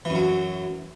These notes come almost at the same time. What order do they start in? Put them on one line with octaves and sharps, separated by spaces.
E3 F#2 F#3